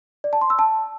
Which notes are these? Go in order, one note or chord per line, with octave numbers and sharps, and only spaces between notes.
D5
A5
C6
E6
A5